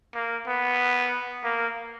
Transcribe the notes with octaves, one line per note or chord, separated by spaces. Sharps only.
A#3
B3
A#3